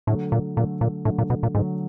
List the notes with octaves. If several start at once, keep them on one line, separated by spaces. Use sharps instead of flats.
A2 D3 F#3 A3
A#2
A#2 D3 F#3 A3
A#2
A2 D3 F#3 A3
A#2
B2
A#2
G#2 D3 F#3 A3